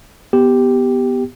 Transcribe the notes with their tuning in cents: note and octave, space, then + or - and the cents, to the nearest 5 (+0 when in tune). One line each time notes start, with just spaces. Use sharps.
B3 +0 G4 +0